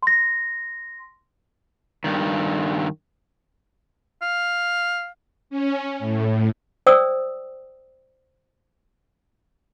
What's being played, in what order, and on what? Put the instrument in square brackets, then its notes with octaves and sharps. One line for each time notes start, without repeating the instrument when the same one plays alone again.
[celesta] C6 A#6
[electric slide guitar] G2 D#3
[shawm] F5
[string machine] C#4
A2
[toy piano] C5 D5 G5 D#6 E6